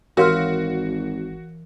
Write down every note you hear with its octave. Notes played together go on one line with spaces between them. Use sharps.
G#1 E3 F#4 A#4 C#5 F5 C6 F6